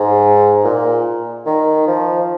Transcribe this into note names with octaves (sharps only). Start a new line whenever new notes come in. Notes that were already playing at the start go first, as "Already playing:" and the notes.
Already playing: G#2
A#2
D#3
F3